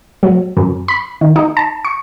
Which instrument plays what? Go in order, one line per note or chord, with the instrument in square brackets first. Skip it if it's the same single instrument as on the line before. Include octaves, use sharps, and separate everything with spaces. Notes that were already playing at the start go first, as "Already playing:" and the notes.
[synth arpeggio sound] F#3
F#2
B5
D#3
D#4
A5
C#6